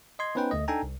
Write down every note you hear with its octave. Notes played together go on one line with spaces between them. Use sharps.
D#5 C6 G#6
B3 C#4 D#4 B4 C5 G5
D2 A3 D#5
D4 D#4 A4 G5 G#5 A#5
C2